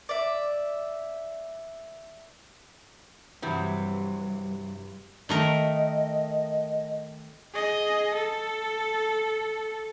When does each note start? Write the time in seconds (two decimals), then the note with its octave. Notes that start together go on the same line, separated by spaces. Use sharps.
0.09 D5 E5
3.42 G2 C3 E3 F#3
5.29 D#3 A3 A#4 D#5
7.53 G#4 D#5
8.14 A4